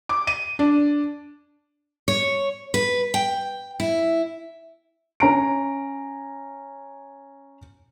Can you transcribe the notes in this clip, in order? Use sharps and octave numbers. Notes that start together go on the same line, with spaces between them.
D6
D#7
D4
C#5
B4
G5
E4
C#4 A#5 D7